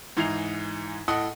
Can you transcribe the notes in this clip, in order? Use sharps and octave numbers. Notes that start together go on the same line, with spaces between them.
G#2 E3 D#4 C7 F7
A2 A4 D#5 F#5 D#6